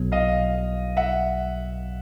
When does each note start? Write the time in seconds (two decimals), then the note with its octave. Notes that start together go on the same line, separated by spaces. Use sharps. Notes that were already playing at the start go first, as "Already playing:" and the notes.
Already playing: B1 B2 F#3 B3
0.12 D#5 F5
0.97 E5 F#5